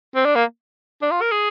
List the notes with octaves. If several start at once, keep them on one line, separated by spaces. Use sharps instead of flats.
C4
D4
A#3
D4
F4
A#4
G#4